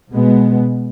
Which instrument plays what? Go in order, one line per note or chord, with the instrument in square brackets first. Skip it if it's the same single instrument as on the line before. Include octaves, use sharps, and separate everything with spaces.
[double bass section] B2 G#3 B3